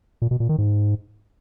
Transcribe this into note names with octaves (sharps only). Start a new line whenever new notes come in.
A#2
B2
A#2
D#3
G#2